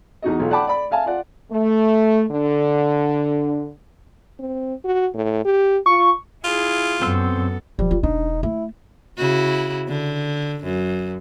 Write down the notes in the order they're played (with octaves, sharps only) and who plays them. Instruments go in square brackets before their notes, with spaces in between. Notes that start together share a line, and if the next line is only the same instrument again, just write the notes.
[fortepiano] E2 D#4 F#4 D#5
B1 F4
D5 F#5 G5 A5 B5 D6
D5 B5
E5 F5 G#5 A5
F4 D5 F#5
[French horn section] A3
D3
[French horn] C4
F#4
A2
G4
[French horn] F4 [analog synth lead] C#6
[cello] E4 G#4 [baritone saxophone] F4
[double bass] F#2 [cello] B3 A4 [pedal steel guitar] C4 C6 E6
[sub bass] E1 [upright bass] F3 [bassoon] G3
[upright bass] F4
[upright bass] D4 [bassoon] D#4
[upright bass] A3 [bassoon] E4
[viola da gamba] C#3 E4 F#4
D3
F#2